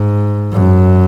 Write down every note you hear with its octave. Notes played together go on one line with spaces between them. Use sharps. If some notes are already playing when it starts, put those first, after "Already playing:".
Already playing: G#2
F#2